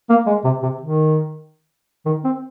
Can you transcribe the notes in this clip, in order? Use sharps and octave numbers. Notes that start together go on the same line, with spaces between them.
A#3
G#3
C3
C3
D#3
D#3
C4